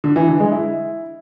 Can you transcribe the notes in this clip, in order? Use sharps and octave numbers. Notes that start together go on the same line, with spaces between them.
D3
E3
D3
G#3
E4